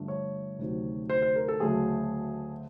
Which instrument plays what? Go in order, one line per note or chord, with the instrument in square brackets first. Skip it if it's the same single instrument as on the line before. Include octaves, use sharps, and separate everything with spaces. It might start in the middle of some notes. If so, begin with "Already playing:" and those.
Already playing: [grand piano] G2 D3 F3 A3 D4
C#5
D2 C3 D#3 F#3
C5
C5
A#4
A4
D2 C#3 F#3 A3 G#4